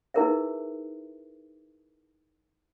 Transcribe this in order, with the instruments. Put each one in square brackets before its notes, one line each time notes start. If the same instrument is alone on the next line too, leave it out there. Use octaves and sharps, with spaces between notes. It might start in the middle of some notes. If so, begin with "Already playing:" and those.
[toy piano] D#4 E4 G#4 A#4 B4 E5